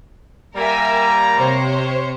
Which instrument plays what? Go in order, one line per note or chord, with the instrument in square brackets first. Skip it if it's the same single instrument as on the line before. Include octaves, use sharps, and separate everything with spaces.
[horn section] G3 A#3 A#5 [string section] A#4 E5 G#5
[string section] C3 C5 C#5